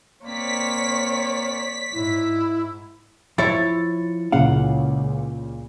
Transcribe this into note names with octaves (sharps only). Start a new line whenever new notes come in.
A#3 C4 C#5 D5 B6
G#2 E4
F3 E4 C#5 A6
C#2 A#2 C#3 F5 F#5